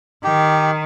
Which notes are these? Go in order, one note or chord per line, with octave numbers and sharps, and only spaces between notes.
D#3 G4